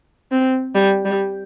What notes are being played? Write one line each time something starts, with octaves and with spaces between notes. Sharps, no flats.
C4
G3
G3